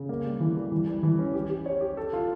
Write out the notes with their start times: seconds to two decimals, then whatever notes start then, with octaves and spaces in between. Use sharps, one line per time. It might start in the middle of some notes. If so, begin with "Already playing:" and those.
Already playing: C#3
0.09 A#3
0.24 G3
0.40 E3
0.57 G3
0.72 E3
0.87 G3
1.03 E3
1.19 C#4
1.34 G4
1.50 G4
1.66 C#5
1.81 G4
1.97 A4
2.13 F4